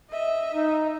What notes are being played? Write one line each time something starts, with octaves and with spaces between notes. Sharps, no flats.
D#5 E5
D#4